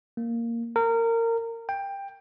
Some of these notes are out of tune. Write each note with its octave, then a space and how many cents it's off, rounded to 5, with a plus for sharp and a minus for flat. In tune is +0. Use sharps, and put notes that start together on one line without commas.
A#3 -5
A#4 -25
G5 +15